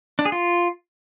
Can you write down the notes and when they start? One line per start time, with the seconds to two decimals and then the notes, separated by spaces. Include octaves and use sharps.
0.19 D4
0.25 G#4
0.32 F4